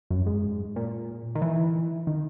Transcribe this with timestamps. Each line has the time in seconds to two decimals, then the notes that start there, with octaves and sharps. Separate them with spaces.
0.10 F#2
0.26 G#2
0.76 A#2
1.35 D#3
1.42 E3
2.07 D#3